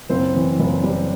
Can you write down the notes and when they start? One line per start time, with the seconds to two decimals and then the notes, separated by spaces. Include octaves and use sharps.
0.09 F#1 C4 C5
0.35 E3
0.59 F#1
0.83 G3